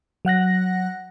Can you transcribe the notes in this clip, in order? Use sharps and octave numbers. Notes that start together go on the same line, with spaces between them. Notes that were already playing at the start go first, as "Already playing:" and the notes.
F#3 F#5 F#6 A#6